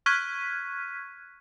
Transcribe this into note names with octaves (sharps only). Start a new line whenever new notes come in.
C#6 F6 F#6 G#6 B6 D#7